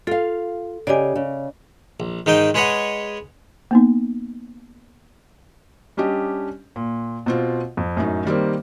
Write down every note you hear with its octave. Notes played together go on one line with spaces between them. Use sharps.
F4 A4 F5
C#3 G4 D5 D#5 G#5
C#3
A#1
G#2 D#3 D#4 D#5 G5
G#3 G#4 B4 C#5 D#5 F#5
A#3 B3 D#4
G3 C#4 D4 G4 D#5
A#2
B2 C4 F4
F2
F#2 A2 F#3 D#4
D#3 G3 A#3 C4